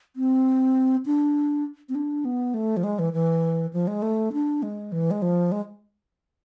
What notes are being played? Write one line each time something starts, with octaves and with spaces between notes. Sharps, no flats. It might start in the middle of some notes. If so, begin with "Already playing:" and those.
C4
D4
C4
D4
B3
A3
F3
G#3
E3
E3
F3
G#3
A3
D4
G#3
E3
G#3
F3
G#3